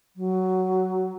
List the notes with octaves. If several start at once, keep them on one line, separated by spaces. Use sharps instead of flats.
F#3